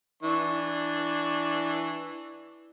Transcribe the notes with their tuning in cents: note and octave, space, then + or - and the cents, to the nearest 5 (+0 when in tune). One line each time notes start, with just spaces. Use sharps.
E3 +0 D4 +0 C#6 +0